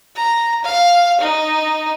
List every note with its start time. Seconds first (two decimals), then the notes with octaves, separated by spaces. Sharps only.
0.16 A#5
0.64 F5
1.21 D#4